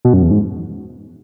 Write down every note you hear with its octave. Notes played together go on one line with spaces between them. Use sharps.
B2
F#2
E2
G#2